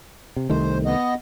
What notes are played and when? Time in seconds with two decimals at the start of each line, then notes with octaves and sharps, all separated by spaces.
0.36 C3
0.50 C2 D#3 A3 C5
0.85 B3 D#5